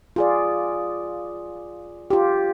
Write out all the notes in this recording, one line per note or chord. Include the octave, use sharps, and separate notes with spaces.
F4 G#4 D5
F4 G4